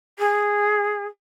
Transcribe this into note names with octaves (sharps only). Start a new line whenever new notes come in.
G#4